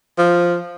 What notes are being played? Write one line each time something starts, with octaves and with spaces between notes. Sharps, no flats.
F3